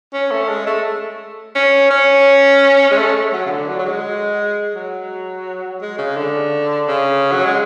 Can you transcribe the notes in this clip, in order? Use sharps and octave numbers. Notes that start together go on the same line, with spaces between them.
C#4
A3
G#3
A3
C#4
C#4
G#3
A3
F#3
C#3
D3
F#3
F#3
G#3
F#3
G#3
C#3
D3
C#3
F#3
G#3